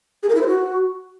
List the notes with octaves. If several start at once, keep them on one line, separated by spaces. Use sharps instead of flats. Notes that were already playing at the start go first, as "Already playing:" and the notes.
G#4
A#4
E4
C5
F#4